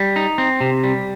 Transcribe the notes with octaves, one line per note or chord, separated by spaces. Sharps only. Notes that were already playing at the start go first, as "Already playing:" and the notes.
Already playing: G3
D#4
C4
C3
G3